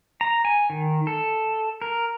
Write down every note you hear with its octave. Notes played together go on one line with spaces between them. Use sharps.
A#5
G#5
D#3
A4
A#4